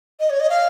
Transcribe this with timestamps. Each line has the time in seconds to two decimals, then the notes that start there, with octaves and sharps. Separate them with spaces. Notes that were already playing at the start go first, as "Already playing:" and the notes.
0.20 D#5
0.30 C#5
0.40 D#5
0.50 F5